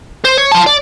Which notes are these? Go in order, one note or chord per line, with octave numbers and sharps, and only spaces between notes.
C5
C#5
F4 A5
D5